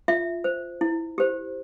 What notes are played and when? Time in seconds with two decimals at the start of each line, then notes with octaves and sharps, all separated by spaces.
0.08 F4 E5
0.44 C5
0.81 E4
1.18 G4 C5